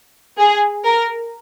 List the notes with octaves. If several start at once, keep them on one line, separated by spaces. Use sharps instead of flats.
G#4
A#4